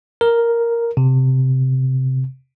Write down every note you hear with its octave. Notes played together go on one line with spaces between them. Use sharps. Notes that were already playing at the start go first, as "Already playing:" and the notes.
A#4
C3